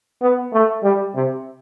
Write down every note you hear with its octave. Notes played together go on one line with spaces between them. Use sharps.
B3
A3
G3
C3